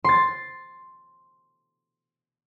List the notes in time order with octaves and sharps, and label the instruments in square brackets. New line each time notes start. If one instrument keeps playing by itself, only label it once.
[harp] C6 A6